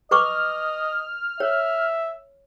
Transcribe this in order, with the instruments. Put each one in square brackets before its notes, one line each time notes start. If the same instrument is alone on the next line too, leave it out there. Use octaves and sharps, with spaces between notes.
[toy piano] B4 C#6 D6 [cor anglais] D#5 [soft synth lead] F6
[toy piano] C#5 [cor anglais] E5